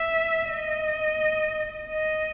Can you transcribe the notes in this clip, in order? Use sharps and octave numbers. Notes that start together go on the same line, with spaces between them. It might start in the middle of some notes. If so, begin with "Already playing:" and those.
Already playing: E5
D#5
D#5